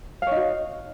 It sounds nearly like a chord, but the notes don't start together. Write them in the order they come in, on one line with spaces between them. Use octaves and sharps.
F5 C#5 D#4 F#4